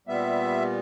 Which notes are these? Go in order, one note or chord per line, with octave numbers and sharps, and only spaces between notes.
A#2 G3 B3 E5